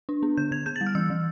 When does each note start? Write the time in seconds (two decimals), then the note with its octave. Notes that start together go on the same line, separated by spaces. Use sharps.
0.09 D4
0.23 B3
0.37 D3 G6
0.51 D3 G#6
0.66 B3 G6
0.76 A6
0.81 G3
0.86 F6
0.95 E3 E6
1.10 E3